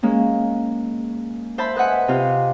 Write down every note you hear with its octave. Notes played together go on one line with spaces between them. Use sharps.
G#3 A#3 C#4
C5 E5 A5 B5
B4 D#5 E5 F#5 G#5
C3 F4